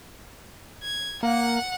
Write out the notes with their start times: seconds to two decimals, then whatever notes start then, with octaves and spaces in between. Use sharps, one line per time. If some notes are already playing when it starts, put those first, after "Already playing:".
0.82 G#6
1.23 A#3 F#5